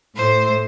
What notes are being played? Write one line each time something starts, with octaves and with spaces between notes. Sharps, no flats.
A2 C5